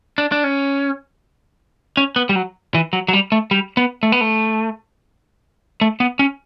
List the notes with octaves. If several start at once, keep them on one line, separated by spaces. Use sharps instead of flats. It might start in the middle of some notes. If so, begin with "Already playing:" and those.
D4
D4
C#4
C#4
B3
G3
F#3
E3
F#3
F#3
G3
A3
G3
B3
A3
B3
A3
A3
B3
C#4